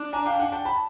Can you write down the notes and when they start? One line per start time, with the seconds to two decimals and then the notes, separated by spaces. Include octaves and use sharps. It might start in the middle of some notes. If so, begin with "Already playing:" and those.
Already playing: D4
0.13 G#5 A#5
0.26 F5 G5
0.39 F#5 G#5
0.52 G5 A5
0.65 A5 B5